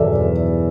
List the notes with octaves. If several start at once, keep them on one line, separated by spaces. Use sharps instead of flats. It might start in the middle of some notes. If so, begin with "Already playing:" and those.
Already playing: E2 B2 A4 D5 E5